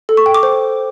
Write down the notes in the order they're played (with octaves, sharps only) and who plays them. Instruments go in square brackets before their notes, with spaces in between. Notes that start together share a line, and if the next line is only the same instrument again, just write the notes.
[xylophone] A4
C#6
G5
D6
C5